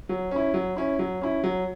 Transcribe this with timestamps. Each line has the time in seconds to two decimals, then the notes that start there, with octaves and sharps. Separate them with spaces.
0.09 F#3
0.31 C#4 E4
0.54 F#3
0.76 C#4 E4
0.99 F#3
1.21 C#4 E4
1.44 F#3